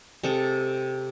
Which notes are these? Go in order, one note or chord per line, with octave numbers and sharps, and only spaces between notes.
C3 G#3 A4